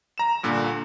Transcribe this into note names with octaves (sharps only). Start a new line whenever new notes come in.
A#5 E7
G2 A#2 D3